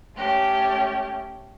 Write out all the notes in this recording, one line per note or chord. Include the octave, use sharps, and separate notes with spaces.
A3 C#4 G4